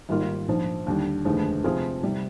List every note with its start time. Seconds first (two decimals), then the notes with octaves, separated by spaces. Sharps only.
0.09 G#1 G#2 G3 A#3 F4
0.48 A#1 G#2 F3
0.86 D#2 D3 G3
1.25 F1 D#2 D3 F3 G#3
1.64 C3 F3 C4 F4 G#4
2.03 C3 G3